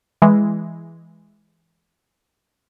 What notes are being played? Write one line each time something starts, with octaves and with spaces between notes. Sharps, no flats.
E3 G#3